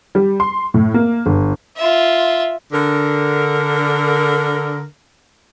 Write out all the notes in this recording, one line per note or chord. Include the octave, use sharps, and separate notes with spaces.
G3
C6
A2
A#3
G1
F4 E5
D3 A#4